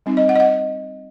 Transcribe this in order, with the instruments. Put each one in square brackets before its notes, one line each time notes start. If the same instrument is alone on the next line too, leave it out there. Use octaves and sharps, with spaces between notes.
[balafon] G3 C4 D#4
D#5
F#5
D#5
F#5